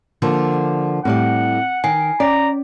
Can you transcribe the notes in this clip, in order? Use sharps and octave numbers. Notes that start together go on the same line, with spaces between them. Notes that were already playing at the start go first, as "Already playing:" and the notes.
D3 F3 A#3
A2 G3 C4 G4 F#5
D#3 G#5 C7
C#4 D5 A#5